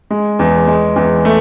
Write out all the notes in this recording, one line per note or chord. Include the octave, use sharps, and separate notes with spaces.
G#3
E2
G#3
E2
A3